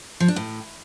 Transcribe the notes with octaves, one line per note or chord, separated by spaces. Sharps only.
F3
D4
A2